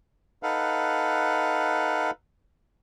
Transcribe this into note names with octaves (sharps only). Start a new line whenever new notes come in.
D#4 A4 B4 F5 F#5